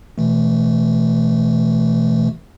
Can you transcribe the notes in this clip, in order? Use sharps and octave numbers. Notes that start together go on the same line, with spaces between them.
B2 E3 A3